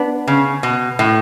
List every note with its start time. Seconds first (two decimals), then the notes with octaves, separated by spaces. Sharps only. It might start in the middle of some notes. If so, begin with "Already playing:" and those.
Already playing: B3 D4
0.28 C#3
0.63 B2
0.99 A2